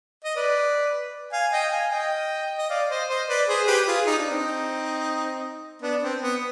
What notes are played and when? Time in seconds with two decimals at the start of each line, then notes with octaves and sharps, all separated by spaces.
0.24 D#5
0.36 B4 D5
1.33 F5 G#5
1.53 D#5 G5
1.72 F5 G#5
1.91 D#5 G5
2.59 D#5
2.70 D5 F5
2.89 C5 D#5
3.09 C5 D#5
3.29 B4 D5
3.48 G#4 C5
3.67 G4 B4
3.87 F4 G#4
4.07 D#4
4.18 D4
4.31 C4 D#4
5.82 B3 D4
6.02 C4
6.22 B3